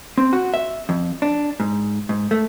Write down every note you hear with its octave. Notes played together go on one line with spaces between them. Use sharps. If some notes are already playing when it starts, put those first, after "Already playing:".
C4
F#4
E5
F2
D4
G#2
G#2
A3